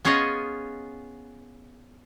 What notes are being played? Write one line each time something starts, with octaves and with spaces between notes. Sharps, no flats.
B3 C#4 F4 G#4 C#5 D#5